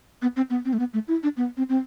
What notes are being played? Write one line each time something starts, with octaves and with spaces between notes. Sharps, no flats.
B3
C4
B3
C4
A3
B3
A3
E4
D4
B3
C4
C4